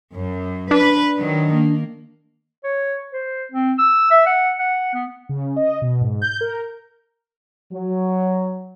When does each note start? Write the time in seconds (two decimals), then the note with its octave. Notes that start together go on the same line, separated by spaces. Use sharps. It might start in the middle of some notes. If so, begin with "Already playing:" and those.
0.13 F#2
0.71 D4 B4
1.18 D#3 F#3
1.53 A#3
2.64 C#5
3.13 C5
3.52 C4
3.78 E6
4.11 E5
4.26 F#5
4.59 F#5
4.94 B3
5.29 C#3
5.56 D#5
5.82 B2
6.01 G#2
6.22 G6
6.41 A#4
7.72 F#3